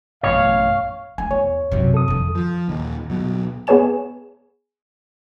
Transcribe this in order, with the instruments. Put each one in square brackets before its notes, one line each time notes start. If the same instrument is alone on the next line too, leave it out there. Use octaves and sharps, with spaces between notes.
[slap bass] A1 F#2 B2 [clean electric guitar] C#5 [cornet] F5
[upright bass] A3 [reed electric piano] G#5
[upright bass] E2 [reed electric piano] C#5
[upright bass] F#2 C3
[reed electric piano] A4 D#6
[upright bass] F2 D#3
[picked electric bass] F3
D#2 A#2 D#3
D1 B2 F#3
[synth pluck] B3 G#4 B4 C#5 G#5 E7